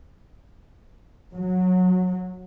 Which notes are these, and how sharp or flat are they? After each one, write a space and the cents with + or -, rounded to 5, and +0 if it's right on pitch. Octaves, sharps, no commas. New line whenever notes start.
F#3 -15